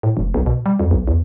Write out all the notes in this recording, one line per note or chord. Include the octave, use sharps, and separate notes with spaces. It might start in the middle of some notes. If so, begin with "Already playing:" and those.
A2
F1
B1
B2
G3
F2
B1
E2